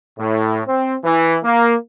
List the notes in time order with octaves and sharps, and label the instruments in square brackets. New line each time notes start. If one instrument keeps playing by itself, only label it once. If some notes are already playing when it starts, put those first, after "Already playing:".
[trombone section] A2
C4
E3
A#3